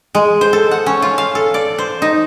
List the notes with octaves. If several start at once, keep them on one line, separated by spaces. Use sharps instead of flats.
G#3
C5
A4
F#5
C#4
F4
F5
A4
D5
C5
D#4